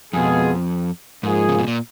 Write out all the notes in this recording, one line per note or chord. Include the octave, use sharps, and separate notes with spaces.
F2 B2 G#3 B3 F4 G#4
G#2 F3 A#3 F4 G#4
C#3
B2
A#2